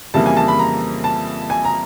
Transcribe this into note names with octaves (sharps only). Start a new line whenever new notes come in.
F2 C#3 E3 G3 A#3 A5
G#5
A5
B5
A#5
A5
G#5
A#5